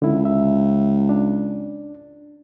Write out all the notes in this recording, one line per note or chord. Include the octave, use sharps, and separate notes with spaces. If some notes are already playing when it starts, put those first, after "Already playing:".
C#2 D3 E4
E5
D4